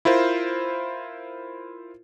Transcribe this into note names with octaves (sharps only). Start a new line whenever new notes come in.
E4 F4 A#4 C5